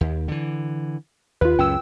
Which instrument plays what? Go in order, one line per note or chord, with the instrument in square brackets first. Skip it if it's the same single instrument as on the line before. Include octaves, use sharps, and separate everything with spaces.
[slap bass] D#2
D3 E3
[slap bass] D#2 [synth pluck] F4 B4
[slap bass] C#2 F#2 C#4 [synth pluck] G5 E6